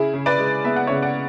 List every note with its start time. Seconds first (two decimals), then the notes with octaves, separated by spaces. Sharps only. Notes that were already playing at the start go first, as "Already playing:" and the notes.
Already playing: C#3 E4 G#4
0.14 C#3
0.26 B4 D5
0.39 G#3
0.64 B3 E5
0.76 F#5
0.87 C#5 E5
0.90 C#3
1.02 D5 F#5